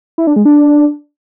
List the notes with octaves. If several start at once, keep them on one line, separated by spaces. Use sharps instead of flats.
E4
D4
G#3
D4